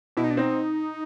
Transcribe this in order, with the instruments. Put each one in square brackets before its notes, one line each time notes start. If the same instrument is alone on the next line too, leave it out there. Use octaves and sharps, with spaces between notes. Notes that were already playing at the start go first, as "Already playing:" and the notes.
[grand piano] B2 [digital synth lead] E4
[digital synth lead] D#4
D4
[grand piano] C4 [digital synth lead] D#4